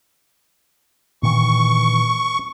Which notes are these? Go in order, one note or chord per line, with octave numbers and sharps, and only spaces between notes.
A#2 D#3 E3 C#6